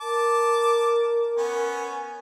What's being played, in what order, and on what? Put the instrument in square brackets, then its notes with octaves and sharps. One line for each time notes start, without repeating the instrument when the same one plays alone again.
[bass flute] A#4 [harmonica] A5 D6
[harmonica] B3 C#4